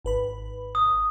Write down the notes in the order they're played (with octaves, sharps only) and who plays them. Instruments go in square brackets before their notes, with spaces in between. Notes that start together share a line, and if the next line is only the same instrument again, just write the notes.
[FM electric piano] G#1 B4 B5
[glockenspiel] D#6